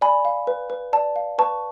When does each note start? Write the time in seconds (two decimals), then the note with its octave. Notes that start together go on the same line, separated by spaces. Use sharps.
0.01 D5 G#5 B5
0.25 F5
0.47 B4
0.70 B4
0.93 D5 A5
1.16 F5
1.38 B4 A5 C#6